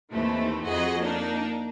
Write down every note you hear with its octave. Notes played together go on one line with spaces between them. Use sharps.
D#2 E3 A3 C4
F2 F#4 G#4 D#5
A#3 D4 D#4